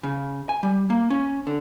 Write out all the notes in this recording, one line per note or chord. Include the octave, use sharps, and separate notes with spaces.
C#3
G#5
G3
A#3
C#4
D3